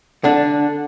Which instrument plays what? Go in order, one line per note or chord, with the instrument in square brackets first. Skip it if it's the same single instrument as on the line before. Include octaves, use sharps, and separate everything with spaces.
[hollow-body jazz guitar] D3 D4